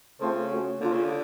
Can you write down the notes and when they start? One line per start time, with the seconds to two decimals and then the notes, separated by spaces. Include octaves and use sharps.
0.20 C#3 A3 C4 F4 A4 C5
0.50 A3 C#4 F#4
0.80 D3 A#3 D4 F4 A#4
0.92 C#3
1.04 D3